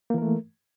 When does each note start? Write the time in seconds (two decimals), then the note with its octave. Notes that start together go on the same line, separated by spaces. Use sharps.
0.10 A#3
0.14 E3
0.18 A#4
0.22 A3